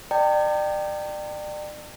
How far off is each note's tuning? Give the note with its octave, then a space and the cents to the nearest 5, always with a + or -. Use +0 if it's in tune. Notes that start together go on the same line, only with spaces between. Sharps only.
D5 +35 G5 +0 A#5 -45